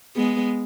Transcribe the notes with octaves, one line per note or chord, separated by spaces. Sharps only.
G#3 B3